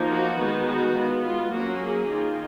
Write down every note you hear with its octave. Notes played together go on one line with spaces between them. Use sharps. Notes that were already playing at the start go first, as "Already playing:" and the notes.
Already playing: F3 A#3 D#4
F#4
D#3 G#3 B3 D#4
F#4
G#3 B3 F4
F4
F#3 A#3 C#4 F#4
G#4
D#3 A#3 F4